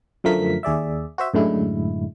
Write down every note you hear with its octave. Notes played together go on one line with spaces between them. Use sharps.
F#2 D3 F3 A3 A#4 B6
D#2 G#4 D5 E5
F#4 C5 E5
F#2 A2 D3 G#3 E4